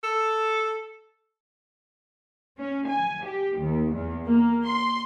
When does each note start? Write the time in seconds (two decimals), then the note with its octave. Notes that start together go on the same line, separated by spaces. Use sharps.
0.04 A4
2.58 C#4
2.89 G#5
3.25 G4
3.60 D#2
3.93 E2
4.27 A#3
4.66 C6